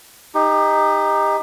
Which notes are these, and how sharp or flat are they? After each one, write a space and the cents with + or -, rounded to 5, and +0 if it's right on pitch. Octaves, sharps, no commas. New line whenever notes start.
D#4 +0 G4 +30